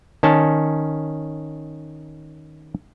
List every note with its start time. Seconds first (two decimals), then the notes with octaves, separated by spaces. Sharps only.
0.23 D#3 C#4 A5